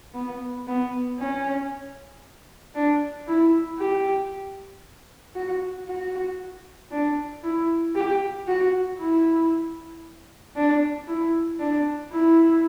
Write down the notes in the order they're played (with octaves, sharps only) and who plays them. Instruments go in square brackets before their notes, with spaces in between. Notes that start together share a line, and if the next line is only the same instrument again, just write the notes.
[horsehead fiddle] B3
B3
C#4
D4
E4
G4
F#4
F#4
D4
E4
G4
F#4
E4
D4
E4
D4
E4